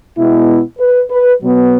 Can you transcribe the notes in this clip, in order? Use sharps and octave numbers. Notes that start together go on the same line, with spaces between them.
B2 G#3 B3 E4
B4
B4
B2 F#3 B3